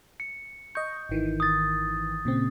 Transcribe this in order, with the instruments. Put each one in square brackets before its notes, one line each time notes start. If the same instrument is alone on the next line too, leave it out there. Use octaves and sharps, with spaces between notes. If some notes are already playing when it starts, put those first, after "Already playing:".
[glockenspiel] C#7
[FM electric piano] D#5 C#6 [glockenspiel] G6
[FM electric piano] G#1 D#3 E3
[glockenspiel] D#6 A6
[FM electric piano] A#2 C#3 C4